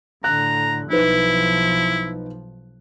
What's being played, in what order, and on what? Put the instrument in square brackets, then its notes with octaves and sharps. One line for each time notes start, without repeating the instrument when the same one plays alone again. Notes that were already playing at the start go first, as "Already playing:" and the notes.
[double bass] A2 D3 [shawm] A#5 [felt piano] F#6
[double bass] B1 F3 [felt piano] D#4 B4 [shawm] E4